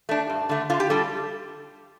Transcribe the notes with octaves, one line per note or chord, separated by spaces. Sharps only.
A3 D4
G2
D3 A3
D3 F4
G4
G3 D4 A4